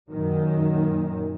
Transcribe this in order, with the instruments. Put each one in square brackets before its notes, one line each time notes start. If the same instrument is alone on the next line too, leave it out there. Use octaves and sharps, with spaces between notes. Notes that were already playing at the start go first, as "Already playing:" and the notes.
[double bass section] F#2 A#2 D#3 F#3